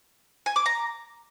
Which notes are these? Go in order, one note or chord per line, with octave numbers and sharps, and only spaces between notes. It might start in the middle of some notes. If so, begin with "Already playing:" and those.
G#5
D6
A#5